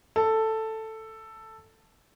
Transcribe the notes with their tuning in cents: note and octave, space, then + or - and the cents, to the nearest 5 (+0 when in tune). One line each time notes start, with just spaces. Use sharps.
A4 +5